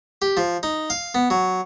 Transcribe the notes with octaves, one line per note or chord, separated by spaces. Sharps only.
G4
F3
D#4
F5
B3
F#3